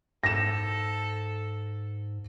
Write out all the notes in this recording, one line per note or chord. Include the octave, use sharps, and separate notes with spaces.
G#2 A4 A#6 E7